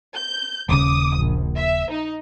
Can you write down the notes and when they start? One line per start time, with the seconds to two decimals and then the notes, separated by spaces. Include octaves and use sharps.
0.15 G6
0.69 D#1 C#3 D6 D#6
1.17 A#1
1.56 E5
1.91 D#4